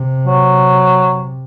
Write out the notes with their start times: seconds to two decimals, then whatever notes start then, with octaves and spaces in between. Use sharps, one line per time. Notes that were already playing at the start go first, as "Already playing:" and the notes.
Already playing: C3
0.26 F#3